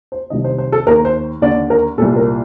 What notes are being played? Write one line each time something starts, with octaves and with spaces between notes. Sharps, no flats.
C5
C2 C3 D#3 D#5
C5
C5
A4
D#2 D#3 A#4
C5
D#2 D3 D5
A#4
C2 A#2 A4
A#4